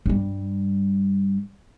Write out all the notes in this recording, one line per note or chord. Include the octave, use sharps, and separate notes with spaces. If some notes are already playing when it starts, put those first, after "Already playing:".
G2 G3